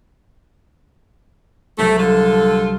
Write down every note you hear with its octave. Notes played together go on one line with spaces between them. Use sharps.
C2 F#3 A3
D3 F4 A4